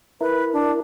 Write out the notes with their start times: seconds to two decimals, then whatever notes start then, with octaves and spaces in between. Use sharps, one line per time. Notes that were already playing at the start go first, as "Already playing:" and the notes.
0.21 E4 A#4 B4
0.53 D4